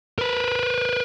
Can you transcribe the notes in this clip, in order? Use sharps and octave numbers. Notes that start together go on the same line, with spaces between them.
A#4 B4